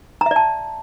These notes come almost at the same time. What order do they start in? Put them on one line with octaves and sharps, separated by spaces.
A#5 E5 D5 A5